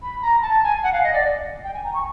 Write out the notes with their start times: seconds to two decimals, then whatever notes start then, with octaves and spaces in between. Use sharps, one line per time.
0.02 B5
0.22 A#5
0.42 A5
0.63 G#5
0.84 F#5
0.93 F5
1.04 D#5
1.13 D5
1.64 G5
1.74 G#5
1.84 A#5
1.94 C#6